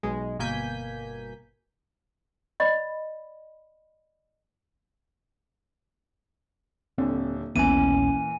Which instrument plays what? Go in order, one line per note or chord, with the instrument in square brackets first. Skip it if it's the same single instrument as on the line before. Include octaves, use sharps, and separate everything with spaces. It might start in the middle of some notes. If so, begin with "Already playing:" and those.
[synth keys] B1 B2 G#3
G1 B2 A#3 G#5 G6 B6
[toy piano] D5 D#5 B5
[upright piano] D#1 D3 [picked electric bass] C4
[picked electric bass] D#1 A#1 B3 [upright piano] A#2 E3 [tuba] C#4 [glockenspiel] G#5 D#7